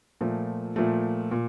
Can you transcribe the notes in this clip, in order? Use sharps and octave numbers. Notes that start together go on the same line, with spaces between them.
A#2 F3 A3
A#2 F3 A3
A#2